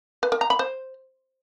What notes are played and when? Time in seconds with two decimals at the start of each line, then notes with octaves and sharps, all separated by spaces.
0.23 B4
0.32 A#4
0.41 A#5
0.50 B5
0.59 C5